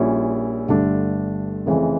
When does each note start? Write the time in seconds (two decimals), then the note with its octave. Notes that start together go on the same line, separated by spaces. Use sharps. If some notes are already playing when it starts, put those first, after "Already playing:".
Already playing: A#1 A#2 G3 C#4 E4
0.68 G1 G2 D3 A3 D4
1.66 F1 F2 C#3 E3